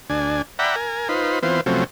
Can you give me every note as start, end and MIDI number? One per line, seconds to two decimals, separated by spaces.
0.10 0.42 38
0.10 0.42 62
0.10 0.42 80
0.59 0.76 74
0.59 0.76 76
0.59 0.76 78
0.59 0.76 79
0.59 0.76 82
0.59 0.76 83
0.76 1.08 70
0.76 1.08 80
1.09 1.39 63
1.09 1.39 65
1.09 1.39 71
1.09 1.39 72
1.43 1.61 52
1.43 1.61 59
1.43 1.61 60
1.43 1.61 65
1.43 1.61 72
1.66 1.84 48
1.66 1.84 53
1.66 1.84 54
1.66 1.84 57
1.66 1.84 60
1.66 1.84 61